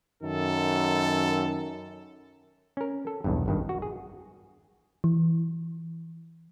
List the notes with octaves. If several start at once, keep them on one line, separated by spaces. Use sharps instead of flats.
F#2 D#3 A4
C#4 A#4
A4
B1 E2 G2
G#1 G2 D#3
F#4
G#4
E3